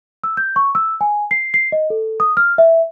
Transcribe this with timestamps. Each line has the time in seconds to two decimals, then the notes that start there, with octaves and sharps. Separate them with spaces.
0.24 E6
0.37 G6
0.56 C#6
0.75 E6
1.01 G#5
1.31 C7
1.54 C7
1.72 D#5
1.90 A4
2.20 D#6
2.37 F6
2.58 E5